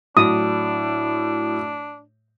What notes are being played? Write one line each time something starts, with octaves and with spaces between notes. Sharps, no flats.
A2 F#3 D4 D#6